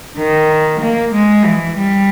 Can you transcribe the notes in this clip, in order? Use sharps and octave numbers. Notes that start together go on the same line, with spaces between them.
D#3
A#3
G#3
E3
G3